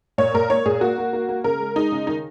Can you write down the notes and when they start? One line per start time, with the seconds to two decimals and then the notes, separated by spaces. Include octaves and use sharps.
0.18 A#2 C#5
0.34 A#2 A#4
0.50 A#3 C#5
0.66 A#2 G#4
0.81 A#3 F#4
0.98 A#3
1.13 A#3
1.29 A#3
1.44 C#3 A#4
1.60 G#3
1.76 G#3 D#4
1.92 C#3
2.07 D#3 D#4